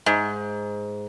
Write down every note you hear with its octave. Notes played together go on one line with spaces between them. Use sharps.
G#2